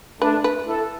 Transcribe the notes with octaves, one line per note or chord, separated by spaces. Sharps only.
A3 D4 B4
B4
E4 A4